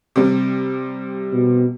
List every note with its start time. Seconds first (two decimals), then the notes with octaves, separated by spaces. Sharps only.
0.16 C3 G3
1.33 B2